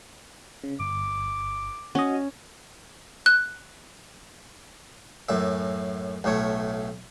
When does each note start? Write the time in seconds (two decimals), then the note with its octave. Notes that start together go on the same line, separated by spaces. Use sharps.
0.64 C#3
0.80 G1 D6
1.95 C#4 F#4 D#5
3.26 F#6
5.29 F#2 A2 E5
6.24 B1 A2 A3 C#5